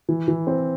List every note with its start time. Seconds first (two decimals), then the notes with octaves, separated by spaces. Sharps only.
0.09 E3
0.28 E3
0.47 C4